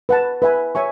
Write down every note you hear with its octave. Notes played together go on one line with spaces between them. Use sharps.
B4 F#5 A5
B4 E5 G#5 B5
C#5 E5 G#5 C#6